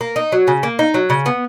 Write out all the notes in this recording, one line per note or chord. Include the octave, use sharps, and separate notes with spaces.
A#3
D#4
F#3
C#3
A#3
D#4
F#3
C#3
B3